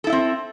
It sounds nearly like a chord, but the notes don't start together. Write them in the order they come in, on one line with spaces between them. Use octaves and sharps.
A4 E4 E5 C4